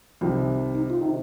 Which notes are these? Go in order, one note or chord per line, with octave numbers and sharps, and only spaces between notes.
C2 C3 D#3 F3 F4
D#4
F4
C3 D#3 D#4